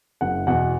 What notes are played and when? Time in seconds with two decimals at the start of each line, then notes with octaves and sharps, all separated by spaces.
0.21 F#1 F#5
0.47 E2 B2 F#5